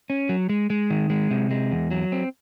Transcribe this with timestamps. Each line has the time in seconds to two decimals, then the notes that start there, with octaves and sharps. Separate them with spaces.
0.10 C#4
0.29 F#3
0.49 G#3
0.70 G#3
0.90 D#3
1.10 G#3
1.31 C3
1.51 G#3
1.72 E2
1.91 F#3
2.12 C4